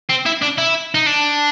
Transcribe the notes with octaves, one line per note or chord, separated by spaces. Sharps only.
C4
E4
D4
E4
D#4
D4